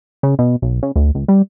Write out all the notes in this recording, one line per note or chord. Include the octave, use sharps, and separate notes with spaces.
C#3
B2
B1
C#3
D2
C#2
G3